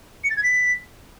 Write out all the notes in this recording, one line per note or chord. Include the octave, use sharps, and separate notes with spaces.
C#7
A6
G#6
B6